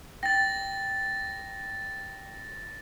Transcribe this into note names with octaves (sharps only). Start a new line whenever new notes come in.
G5 A6 A#6